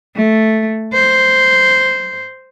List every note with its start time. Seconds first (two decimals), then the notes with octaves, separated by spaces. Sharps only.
0.16 A3
0.93 C5